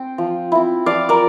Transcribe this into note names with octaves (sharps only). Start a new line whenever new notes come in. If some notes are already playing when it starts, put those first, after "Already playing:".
Already playing: C4 G5
F3
C4 E4
F3 D5 F5
A#4 D5